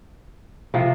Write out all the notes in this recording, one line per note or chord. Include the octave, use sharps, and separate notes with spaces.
C3 F3